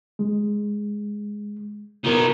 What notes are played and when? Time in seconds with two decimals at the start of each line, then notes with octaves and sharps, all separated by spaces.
0.19 G#3
2.05 B2 D#4 F4 A#4 B4